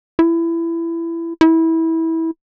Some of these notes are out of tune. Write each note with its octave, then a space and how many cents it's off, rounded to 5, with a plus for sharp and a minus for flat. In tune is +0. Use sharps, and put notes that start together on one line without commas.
E4 +20
E4 -20